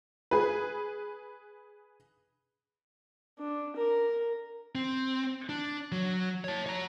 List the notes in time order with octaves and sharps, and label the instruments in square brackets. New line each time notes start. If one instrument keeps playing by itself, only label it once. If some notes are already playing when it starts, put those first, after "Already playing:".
[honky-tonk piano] G#4 B4
[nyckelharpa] D4
A#4
[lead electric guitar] C4
D4
F#3
C#5 A5
C#5 A#5